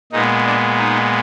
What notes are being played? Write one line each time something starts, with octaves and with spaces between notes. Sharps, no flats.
A#2 G#3 B3 D#4
D4
D#4